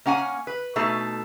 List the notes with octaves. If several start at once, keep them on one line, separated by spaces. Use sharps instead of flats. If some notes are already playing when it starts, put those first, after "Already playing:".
A#3 C#4 F#5 G#5
B4
B2 A3 D#4 A4